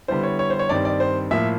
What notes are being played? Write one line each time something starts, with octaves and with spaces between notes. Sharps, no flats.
D3 G3 B3 E4 C5
C#5
C#5
C5
C#5
G2 D#3 G3 C4 D5
D5
C5
A2 F3 A#3 E5